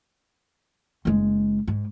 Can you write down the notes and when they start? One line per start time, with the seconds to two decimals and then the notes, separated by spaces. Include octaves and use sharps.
1.05 F#1 G#3
1.68 G#2